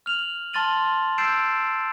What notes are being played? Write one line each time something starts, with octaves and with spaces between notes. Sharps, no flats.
F6 F7 F#7
A5 C6 F6 A6 D#7 F#7
E6 G6 A6 C7 D7 E7